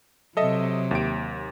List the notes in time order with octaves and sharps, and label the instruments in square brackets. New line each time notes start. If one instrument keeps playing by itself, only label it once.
[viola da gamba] C3 F#3 [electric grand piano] A4 D#5 E5
[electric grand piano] D#2 G4 D7